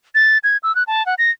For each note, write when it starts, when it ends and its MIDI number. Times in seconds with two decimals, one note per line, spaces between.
0.15 0.38 93
0.44 0.57 92
0.63 0.74 88
0.75 0.83 90
0.87 1.05 81
1.06 1.15 78
1.18 1.31 94